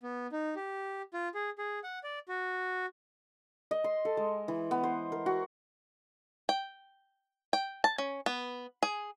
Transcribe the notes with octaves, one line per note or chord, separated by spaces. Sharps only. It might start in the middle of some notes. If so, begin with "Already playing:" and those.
B3
D#4
G4
F4
G#4
G#4
F#5
D5
F#4
D#5
C6
A4
G#3
E3
B3
C5
A#4
F#4
G5
G5
A5
C#4
B3
G#4